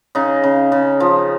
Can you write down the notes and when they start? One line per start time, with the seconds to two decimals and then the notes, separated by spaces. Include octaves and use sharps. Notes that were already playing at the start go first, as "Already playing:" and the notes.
0.15 C#3 D#4
0.44 C#3
0.72 C#3
1.00 F3